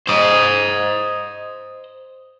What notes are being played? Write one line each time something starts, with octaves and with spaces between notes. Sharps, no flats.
C5 D#5